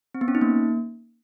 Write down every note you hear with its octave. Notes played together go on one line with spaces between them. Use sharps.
C4
B3
C#4
D#4
A#3